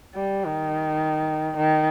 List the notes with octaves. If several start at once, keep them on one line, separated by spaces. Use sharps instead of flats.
G3
D#3
D#3